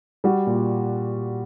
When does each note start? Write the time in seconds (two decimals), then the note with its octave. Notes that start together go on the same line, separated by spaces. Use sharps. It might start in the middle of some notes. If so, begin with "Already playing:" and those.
0.24 G3 F#4
0.47 A#2